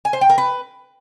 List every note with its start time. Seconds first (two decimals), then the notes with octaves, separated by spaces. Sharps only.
0.05 G#5
0.13 C5
0.21 G5
0.30 A#4
0.38 B4